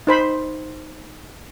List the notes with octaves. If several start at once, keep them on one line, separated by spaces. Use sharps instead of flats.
D#4 C5 B5 C6